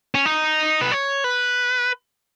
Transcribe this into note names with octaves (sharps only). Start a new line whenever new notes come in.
C#4
D#4
B4
C#5
B4